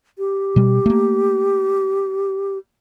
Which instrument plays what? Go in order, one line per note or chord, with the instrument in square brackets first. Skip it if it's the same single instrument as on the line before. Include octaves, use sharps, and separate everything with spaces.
[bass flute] G4
[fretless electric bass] B2 G3
A3 A#3